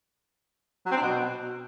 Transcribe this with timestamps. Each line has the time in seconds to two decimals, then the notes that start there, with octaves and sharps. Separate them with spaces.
0.86 F#3
0.91 C4
0.96 D4
1.02 B2